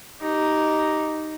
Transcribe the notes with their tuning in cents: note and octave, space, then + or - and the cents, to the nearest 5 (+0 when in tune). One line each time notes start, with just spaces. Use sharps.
D#4 +0 G4 -15